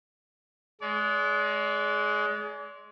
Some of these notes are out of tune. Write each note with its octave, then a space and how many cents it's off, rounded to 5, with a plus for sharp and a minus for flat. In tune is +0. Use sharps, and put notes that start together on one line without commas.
G#3 +20 D5 -40